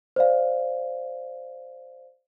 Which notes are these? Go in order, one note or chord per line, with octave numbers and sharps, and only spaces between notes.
C5 D5 F5